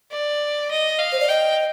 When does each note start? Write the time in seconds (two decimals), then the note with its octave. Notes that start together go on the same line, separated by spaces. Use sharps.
0.11 D5
0.71 D#5
0.99 F5
1.12 C5
1.20 D5
1.29 D#5 G5